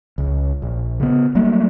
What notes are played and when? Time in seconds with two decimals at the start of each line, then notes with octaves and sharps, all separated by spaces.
0.18 C#2
0.62 A#1
1.00 C#3 B3
1.35 F#3 G3 A3 A#3